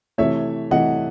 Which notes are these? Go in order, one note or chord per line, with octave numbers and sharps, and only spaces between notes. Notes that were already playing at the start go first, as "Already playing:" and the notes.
C3 E3 A3 C#5 E5
C3 E3 A3 D#5 F#5